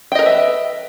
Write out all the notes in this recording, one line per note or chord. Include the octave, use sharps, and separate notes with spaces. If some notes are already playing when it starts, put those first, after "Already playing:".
A#4 B4 D#5 E5 G5